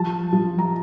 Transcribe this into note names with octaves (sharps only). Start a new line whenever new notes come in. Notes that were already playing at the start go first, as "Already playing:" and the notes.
Already playing: F3 A5
F3
A#5